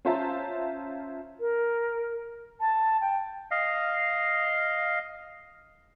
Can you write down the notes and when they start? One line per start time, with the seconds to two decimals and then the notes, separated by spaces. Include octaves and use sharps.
0.05 C#4 F4 C5 E5 A5 A#5
1.40 A#4
2.61 A5
3.01 G5
3.51 D#5 F5